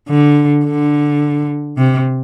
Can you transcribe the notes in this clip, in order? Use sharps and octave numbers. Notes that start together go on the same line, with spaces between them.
D3
D3
C3